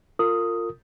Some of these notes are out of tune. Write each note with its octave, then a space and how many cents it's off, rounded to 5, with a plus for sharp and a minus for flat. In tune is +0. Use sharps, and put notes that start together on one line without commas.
F4 +0 A#4 -35 D#6 +5